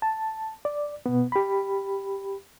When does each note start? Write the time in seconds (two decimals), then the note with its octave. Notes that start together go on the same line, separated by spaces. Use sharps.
0.02 A5
0.65 D5
1.06 B2 B3
1.32 G4 B5